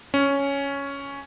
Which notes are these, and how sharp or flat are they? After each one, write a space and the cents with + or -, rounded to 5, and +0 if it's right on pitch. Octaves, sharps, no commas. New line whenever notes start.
C#4 +5